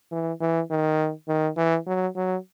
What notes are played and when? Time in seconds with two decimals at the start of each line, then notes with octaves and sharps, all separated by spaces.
0.12 E3
0.41 E3
0.71 D#3
1.28 D#3
1.57 E3
1.87 F#3
2.16 F#3